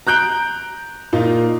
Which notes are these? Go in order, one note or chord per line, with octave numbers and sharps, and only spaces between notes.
A#5 F#6 G6 D7
A#2 A#3 D#4 F4